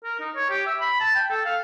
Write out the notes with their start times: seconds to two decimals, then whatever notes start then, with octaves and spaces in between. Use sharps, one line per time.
0.04 A#4
0.20 D#4
0.36 C#5
0.49 G4
0.66 E5
0.80 B5
1.00 A5
1.15 G5
1.30 A4
1.45 F5